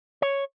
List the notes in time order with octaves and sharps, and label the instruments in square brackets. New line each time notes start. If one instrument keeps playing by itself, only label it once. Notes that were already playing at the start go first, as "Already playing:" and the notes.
[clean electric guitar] C#5